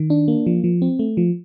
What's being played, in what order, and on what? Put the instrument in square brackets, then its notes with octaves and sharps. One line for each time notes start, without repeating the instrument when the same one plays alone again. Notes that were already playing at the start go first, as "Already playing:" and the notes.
Already playing: [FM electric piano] D#3
D4
A#3
F3
F3
C4
A3
F3